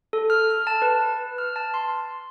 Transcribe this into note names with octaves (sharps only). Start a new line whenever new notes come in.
A4
F6
F6
A5
B4
F6
A5
C6